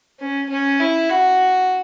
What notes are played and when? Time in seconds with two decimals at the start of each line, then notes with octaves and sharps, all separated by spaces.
0.20 C#4
0.49 C#4
0.80 E4
1.09 F#4